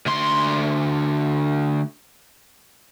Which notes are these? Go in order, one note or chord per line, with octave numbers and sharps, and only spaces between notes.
D2 C6